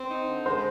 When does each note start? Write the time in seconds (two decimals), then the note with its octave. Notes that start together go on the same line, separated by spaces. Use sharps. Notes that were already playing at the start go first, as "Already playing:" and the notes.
Already playing: C4
0.10 D#4
0.28 D3
0.46 G#3 C5